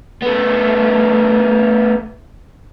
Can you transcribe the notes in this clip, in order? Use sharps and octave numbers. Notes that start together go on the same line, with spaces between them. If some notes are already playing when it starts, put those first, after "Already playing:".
A3 B3